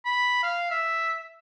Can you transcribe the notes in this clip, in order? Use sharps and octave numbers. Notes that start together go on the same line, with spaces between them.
B5
F5
E5